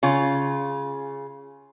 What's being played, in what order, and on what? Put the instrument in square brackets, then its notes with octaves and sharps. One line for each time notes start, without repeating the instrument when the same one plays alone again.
[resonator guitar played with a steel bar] C#3 F4